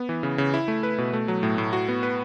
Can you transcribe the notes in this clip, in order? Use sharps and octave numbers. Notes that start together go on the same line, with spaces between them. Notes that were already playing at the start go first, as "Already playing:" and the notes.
Already playing: B3
E3
C#3
C#3
E4
A3
B4
B2
A3
F#3
A2
A2
F#4
B3
B4